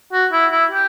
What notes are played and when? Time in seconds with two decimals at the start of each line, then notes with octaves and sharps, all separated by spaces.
0.12 F#4
0.32 E4
0.52 E4
0.71 G4